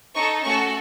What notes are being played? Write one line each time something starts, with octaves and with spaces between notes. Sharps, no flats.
D#4 A4 C#6
A3 C#4 F#4 A4 C#6